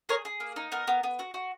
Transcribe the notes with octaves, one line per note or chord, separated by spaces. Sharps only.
G#4 A#4 C#5
G#4
A#3
D#4
B3 A#4
B3
B3
F#4
F#4